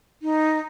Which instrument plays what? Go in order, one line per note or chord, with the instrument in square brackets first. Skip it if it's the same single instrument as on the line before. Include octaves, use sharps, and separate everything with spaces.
[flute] D#4